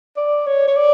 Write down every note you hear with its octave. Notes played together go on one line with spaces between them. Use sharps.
D5
C#5
C#5
D5